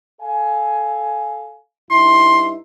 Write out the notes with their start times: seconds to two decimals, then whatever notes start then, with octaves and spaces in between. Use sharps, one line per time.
0.21 A4 F5 G#5
1.91 G2 D#4 E4 C6